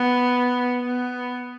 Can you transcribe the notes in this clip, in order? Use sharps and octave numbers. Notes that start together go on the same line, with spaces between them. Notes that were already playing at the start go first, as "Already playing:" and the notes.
Already playing: B3
B3